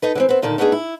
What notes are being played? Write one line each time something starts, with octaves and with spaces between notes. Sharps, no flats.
D#4 A4 B4
D3 E3 C4
B3 C4
A#2 D3 D#3 A5
A3 B3 D4 D#4 G4 G#4
E4